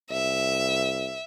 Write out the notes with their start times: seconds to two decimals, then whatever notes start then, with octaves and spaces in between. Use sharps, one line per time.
0.11 C2 E5